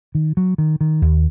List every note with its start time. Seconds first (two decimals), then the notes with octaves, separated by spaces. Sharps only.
0.15 D#3
0.37 F#3
0.58 D#3
0.81 D#3
1.02 D#2